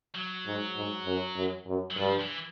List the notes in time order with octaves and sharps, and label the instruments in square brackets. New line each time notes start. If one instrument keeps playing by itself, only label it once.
[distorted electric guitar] F#3
[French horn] G#2
G#2
F#2
F#2
F#2
[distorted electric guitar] F#3
[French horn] G2 [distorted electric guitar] F3
[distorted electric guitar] E3